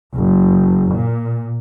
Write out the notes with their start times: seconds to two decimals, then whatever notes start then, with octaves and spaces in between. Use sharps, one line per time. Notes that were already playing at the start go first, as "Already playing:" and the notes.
0.14 F#1
0.92 A#2